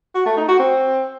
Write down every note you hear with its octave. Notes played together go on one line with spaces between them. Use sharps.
F#4
A3
D#4
F#4
C4